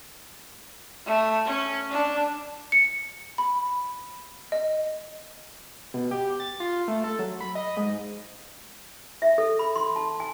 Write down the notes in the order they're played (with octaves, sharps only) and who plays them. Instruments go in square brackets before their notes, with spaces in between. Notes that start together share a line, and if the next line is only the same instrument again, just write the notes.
[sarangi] A3
C#4
D4
[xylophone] C#7
B5
D#5
[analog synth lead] B2
G4
A6
F4
A3
A4
F#3
B5
D#5
G#2
[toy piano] E5
A4
B5
C6
A5
G#5